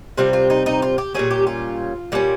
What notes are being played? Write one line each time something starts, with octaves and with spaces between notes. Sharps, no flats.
C3 G3 C4 F4
F4
D#4
D#4
F4
G4
A#2 G3 C#4 G#4
G4
F4
A#2 G3 C#4